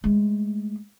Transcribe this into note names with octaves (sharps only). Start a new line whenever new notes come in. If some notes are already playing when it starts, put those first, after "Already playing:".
G#3 A3